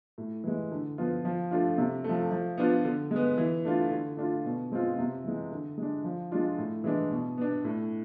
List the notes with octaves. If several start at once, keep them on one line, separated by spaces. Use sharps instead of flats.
A2
E3 G#3
D3
F3 B3 F4
F3
A3 D4 F4
C3
F3 A3
F3
B3 D4 F4
D3
G#3
B3
E3
A3 D4 F4
D3
A3 D4 F4
B2
G#3 C4 F4
C3
E3 G#3
D3
G#3 D4
F3
G#3 D4 F4
A2
E3 G#3 D4
B2
B3 D4
A2